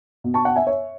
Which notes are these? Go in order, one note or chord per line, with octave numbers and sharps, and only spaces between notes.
B2
A5 C#6
F#5 A5
E5 G#5
C#5 E5